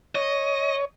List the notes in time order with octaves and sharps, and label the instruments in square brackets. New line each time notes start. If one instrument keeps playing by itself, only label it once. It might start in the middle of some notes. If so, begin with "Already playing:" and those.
[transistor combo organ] C#5 [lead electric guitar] D#5